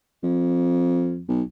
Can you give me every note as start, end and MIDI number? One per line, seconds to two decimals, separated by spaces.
0.23 1.22 41
1.28 1.42 35